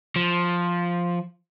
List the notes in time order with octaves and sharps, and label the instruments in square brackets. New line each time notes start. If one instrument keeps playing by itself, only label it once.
[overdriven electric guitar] F3